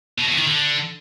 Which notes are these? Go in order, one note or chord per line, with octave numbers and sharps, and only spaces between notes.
B2
E2
D#3
D3